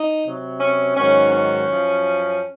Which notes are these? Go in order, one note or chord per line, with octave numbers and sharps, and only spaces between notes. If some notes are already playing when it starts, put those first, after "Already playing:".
Already playing: D#4
C3 F#3
C#4
G#2 D#3 F#3 C#4
C#4
F#2 F3